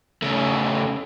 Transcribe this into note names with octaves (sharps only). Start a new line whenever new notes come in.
C#3 A3